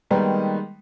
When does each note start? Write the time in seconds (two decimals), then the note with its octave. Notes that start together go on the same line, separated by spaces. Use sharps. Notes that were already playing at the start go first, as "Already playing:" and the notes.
0.10 D#3 G3 G#3 A#3 B3 D#4